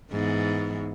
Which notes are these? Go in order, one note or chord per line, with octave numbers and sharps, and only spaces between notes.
G#2 E3 B3